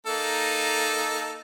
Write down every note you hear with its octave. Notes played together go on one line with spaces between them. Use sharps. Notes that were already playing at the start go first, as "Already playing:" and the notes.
A#3 D#4 A4